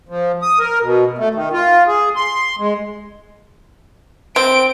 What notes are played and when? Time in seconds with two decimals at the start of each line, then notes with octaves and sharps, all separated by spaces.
0.09 F3
0.42 D#6
0.59 A#4
0.82 B2
1.18 A3
1.34 D#3
1.53 F4
1.87 G#4
2.16 C6
2.59 G#3
4.36 C4 D7